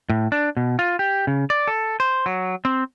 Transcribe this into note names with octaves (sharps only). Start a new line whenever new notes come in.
A2
D4
B2
F4
G4
C#3
D5
A4
C5
F#3
C4